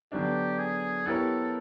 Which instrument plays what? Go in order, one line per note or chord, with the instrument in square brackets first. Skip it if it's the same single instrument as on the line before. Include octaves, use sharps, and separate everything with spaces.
[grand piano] D3 F#3 B3 D4 [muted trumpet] G4
[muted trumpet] G#4
[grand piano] B3 E4 G4 A#4 C#5 [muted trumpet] A4